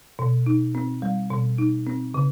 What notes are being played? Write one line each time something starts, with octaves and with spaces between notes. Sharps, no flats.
B2
D#4
C4
G3
B2
D#4
C4
C#3